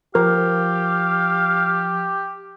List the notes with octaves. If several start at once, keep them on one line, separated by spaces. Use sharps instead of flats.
F3 G4 A#4 F5